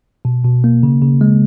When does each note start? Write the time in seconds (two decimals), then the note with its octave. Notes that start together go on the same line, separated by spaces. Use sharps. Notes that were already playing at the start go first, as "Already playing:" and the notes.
0.25 B2
0.44 B2
0.64 A#3
0.83 C#3
1.02 C#3
1.21 G#3